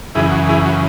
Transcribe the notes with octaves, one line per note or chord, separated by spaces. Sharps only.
F#2 C#3 E3 E4 G#4
F#4
E4 G#4
F#4